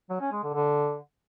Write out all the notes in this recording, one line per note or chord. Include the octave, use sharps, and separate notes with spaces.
F#3
C#4
G#3
D3
D3